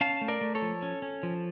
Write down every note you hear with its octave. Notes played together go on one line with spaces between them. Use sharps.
C#4 F5 A5
A3
A#4 D5
A3
A4 C#5
F3
C#4
C#4
F3